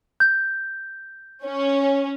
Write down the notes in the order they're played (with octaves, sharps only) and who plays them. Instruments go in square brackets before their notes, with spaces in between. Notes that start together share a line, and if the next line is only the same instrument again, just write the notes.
[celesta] G6
[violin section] C#4